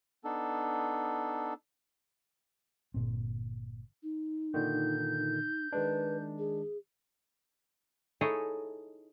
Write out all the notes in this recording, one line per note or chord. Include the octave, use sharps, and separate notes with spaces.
B3 D4 D#4 A4
G1 A#2 C4
D#4
A#2 D3 D#3 G6
D#3 G#3 D4 B4
G#4
D#4 E4 G#4 A4 C#5 D#5